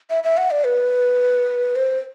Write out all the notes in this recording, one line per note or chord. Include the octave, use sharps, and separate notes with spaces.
E5
E5
F#5
D5
B4
C5